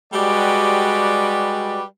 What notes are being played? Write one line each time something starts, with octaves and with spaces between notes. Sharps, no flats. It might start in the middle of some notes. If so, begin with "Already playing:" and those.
G3 G#3 F#4 G4 B4 D5